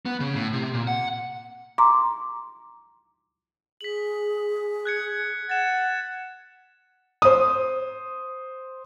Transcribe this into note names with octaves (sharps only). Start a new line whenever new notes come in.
B3
C#3
A2
C3
A#2
F#5
A#5 C6 D6
G#4 B6 F#7
F#6 G#6 C#7
F#5 A6 E7
C5 D#6